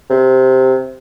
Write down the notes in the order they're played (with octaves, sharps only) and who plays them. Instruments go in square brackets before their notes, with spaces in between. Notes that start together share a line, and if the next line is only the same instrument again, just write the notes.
[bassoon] C3